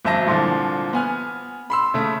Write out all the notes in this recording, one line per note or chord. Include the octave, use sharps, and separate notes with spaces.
G#1 F#2 E5 A5 A#6
C2 A#2 D3 F3
B3 G#5 F6
B5 C6 E6
C#3 A3 E5